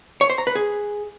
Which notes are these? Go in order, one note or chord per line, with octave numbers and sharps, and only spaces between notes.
C#5
C5
A#5
B4
G#4